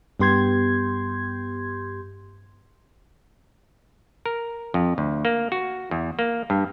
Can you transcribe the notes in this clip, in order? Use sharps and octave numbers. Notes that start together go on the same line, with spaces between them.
G2 B3 G4 C6 G6 G#6
A#4
F2
D2
A#3
F#4
E2
A#3
G2